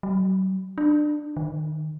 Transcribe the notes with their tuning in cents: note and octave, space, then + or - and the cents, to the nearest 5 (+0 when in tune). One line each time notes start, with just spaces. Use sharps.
F#3 +40
D4 +25
D#3 -20